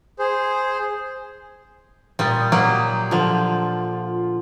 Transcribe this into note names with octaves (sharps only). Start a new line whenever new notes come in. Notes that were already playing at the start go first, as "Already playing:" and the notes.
G#4 C5
A#2 G3 D#6
F#3 A#3 G4
D3 F3 F4